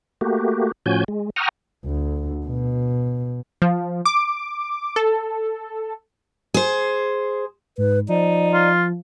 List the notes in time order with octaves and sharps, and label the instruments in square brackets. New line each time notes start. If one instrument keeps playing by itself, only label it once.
[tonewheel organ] A3 A#3 F#4 G4
A2 F3 C#4 F#4 G#5 G6
G#3
F#5 G5 A#5 C#6 D#6 F6
[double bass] D2
B2
[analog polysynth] F3
D6
A4
[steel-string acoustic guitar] G#4 C5
[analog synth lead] G#2 [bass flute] B4
[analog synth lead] F3 [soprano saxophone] D#4 [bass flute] D5
[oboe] F4